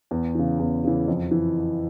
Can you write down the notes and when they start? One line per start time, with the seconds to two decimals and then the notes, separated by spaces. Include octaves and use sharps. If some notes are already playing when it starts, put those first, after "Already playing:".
0.11 E2
0.35 C#3 E3
0.59 E2
0.84 C#3 E3
1.08 F2
1.31 E3